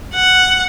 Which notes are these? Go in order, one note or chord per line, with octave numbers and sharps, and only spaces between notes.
F#5